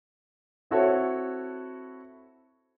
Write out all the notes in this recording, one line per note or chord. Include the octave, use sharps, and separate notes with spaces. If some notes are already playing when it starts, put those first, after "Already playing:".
C4 E4 F#4 A4 C#5